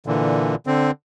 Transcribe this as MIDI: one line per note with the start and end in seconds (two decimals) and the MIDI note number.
0.07 0.55 46
0.07 0.55 50
0.07 0.55 52
0.67 0.91 50
0.67 0.91 60